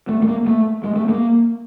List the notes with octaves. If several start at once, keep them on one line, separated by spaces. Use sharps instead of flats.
A3
A3
A#3
A3
G#3
A3
A#3